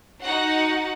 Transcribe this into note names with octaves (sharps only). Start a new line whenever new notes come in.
D#4 F#4 F#5